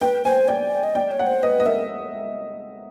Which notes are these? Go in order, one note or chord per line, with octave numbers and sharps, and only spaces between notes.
B4 G5
C5 G#5
D5 G5
D#5
D5 G5
C#5
F#5
C5
B4 D#5
D#5
A#4 E5